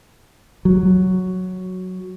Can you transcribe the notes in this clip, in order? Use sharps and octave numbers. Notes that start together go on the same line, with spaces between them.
F#3